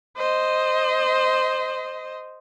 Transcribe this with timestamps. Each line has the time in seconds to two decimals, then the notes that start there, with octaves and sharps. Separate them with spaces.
0.17 C5 D#5